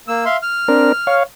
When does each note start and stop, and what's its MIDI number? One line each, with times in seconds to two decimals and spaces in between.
0.08 0.25 58
0.08 0.25 88
0.25 0.37 76
0.25 0.37 77
0.25 0.37 84
0.42 1.15 89
0.68 0.92 60
0.68 0.92 62
0.68 0.92 70
1.07 1.23 73
1.07 1.23 77